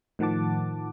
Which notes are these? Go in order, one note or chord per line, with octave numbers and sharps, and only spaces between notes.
A2 D#3 F3 F#5 A5 D6